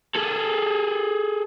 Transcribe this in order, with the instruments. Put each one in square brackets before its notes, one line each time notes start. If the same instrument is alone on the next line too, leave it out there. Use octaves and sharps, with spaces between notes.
[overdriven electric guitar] G#4 A4